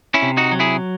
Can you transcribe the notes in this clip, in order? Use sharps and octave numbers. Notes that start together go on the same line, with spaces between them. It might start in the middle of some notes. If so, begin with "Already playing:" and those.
C#4 E4
C3
D#4 F#4
F#3
E4 G#4